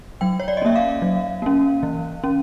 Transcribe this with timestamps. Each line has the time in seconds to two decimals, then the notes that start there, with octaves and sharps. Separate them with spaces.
0.21 F#3 G5
0.40 C#5
0.48 D5
0.57 D#5
0.62 A#3 C#4 E5
0.76 F5
1.02 F#3
1.42 A#3 C#4
1.83 E3
2.24 C#4